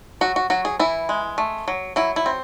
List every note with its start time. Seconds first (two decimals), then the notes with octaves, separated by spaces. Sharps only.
0.21 F#3 F#4
0.36 F#4
0.50 F#3 F#4
0.65 G#4
0.79 E3 E4
1.09 G#3
1.38 A3
1.68 F#3
1.96 F#3 E4
2.16 E4
2.26 C4